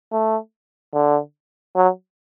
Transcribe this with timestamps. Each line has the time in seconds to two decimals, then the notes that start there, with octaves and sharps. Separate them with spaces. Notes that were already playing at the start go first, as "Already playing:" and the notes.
0.12 A3
0.94 D3
1.76 F#3